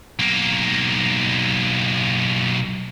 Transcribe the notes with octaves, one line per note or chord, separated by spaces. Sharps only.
B1 A#3